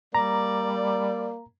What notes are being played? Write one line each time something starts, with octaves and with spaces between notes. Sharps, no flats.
G3 A#3 D5 A#5